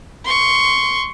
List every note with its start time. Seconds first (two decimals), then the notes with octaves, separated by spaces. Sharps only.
0.25 C6 C#6